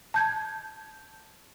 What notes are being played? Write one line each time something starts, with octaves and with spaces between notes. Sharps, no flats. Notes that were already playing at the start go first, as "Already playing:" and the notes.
A5 G6 G#6